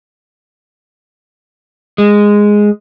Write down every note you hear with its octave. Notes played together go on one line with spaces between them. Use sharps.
G#3